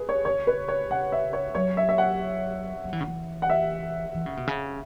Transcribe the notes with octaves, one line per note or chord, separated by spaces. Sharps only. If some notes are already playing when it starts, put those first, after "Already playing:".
Already playing: G#4 B4
C#5
C#3 C#5
B4
C#5
C#3 F#5
E5
C#5
F#3 C#5
E5
E5
F#5
F#3
E3
C#3
E3
F#5
E5
E3
C#3
B2
C#3